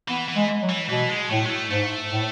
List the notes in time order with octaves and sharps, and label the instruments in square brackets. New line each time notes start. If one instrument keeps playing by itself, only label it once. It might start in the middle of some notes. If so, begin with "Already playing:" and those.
[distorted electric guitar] E3 [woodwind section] B3
[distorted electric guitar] E3
[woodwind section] G#3
F#3
[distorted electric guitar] E3
[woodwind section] B2 [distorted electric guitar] E3
[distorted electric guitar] G#3
[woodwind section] A2 [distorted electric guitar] A3
[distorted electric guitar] G#3
A3
[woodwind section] G#2 [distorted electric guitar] A3
[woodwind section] A2